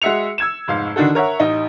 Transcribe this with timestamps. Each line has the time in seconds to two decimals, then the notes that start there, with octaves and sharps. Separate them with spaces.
0.02 G#3 F#4 E5 C#7 F7
0.38 E6 G#6 E7
0.68 F1 G#2 F5
0.96 D3 D#3 D4 F#4 A4
1.15 A#4 C#5 E5 F#5
1.40 A1 D#4